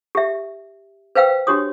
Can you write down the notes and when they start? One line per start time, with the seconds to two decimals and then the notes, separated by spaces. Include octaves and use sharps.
0.15 G4 E5
1.15 B4 C5 F5 G5 E6
1.47 D4 F#4 G4 C#5 D#6